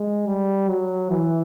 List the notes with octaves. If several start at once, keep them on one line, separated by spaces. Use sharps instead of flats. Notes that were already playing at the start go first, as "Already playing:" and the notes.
Already playing: G#3
G3
F#3
E3